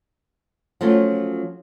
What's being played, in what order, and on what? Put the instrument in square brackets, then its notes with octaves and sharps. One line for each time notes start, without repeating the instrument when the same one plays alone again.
[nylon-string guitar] F3 F#3 A3 C#4 F4